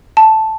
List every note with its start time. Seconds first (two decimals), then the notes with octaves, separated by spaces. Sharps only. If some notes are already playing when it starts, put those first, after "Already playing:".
0.17 A5